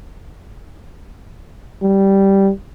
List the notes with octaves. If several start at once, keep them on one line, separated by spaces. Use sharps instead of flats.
G3